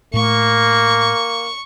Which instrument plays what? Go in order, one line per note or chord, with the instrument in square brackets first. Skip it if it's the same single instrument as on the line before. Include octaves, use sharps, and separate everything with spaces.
[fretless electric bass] A2 A3 [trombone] A#3 [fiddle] C#6